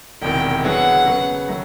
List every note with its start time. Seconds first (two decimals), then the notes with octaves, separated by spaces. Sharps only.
0.22 E1 E2 C3 D#3 G5
0.64 D3 F#3 B3 E4 G#4 F#5
1.06 C#3 F#3 B3
1.48 D#3 F#3 A3